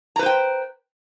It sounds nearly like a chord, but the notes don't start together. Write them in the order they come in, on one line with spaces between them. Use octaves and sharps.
A#5 B4 C5 G5